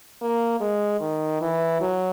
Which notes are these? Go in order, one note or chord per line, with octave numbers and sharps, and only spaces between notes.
A#3
G#3
D#3
E3
F#3